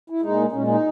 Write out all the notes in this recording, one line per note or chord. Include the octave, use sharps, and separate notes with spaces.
E4
A#2 G#3 D#4
A#2 G#3 C#4
D#4